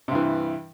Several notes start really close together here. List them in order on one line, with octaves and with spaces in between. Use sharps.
C3 G2 E3